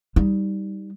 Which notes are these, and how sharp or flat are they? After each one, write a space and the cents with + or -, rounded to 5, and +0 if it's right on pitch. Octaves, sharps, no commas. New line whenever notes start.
G3 +0 D#4 +10